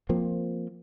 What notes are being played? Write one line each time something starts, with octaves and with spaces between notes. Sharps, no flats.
F3 A#3 C4